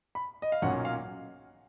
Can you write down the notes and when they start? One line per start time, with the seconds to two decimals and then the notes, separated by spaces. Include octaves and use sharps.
0.15 B5
0.42 D#5
0.52 F5
0.62 B1 A#2 F#3 C#4 F#5
0.85 F5